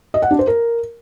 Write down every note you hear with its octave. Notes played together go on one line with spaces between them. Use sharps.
D#5
F#5
D4
C5
A#4